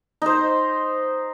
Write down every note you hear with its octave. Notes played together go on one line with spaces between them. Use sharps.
D#4 C5